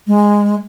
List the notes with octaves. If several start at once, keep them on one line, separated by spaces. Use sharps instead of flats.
G#3